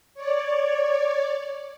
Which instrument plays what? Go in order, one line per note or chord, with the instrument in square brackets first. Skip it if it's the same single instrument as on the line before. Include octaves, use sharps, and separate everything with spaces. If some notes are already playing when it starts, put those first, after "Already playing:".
[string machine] C#5 D5